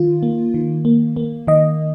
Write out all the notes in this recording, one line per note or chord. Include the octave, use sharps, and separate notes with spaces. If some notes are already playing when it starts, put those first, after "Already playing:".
Already playing: D#3 F4
A#3
D#3
A#3
A#3
D#3 D#5